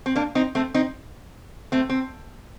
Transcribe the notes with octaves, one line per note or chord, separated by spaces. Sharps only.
C4
A#3 D4
C4 D#4
A3 C4
C4 D#4
A3 C4
C4